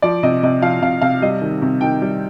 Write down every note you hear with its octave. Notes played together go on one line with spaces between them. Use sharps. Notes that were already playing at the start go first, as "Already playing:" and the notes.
F3 D5
C3 D#5
C3 D#5
F3 F5
C3 F5
C3 F5
G3 D#5
D#3
C3
D#3 G5
G3